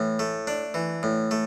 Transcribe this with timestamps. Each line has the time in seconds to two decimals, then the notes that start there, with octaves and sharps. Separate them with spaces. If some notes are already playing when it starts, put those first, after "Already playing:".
Already playing: A2 E3
0.19 A3
0.47 D4
0.74 E3
1.03 A2
1.31 A3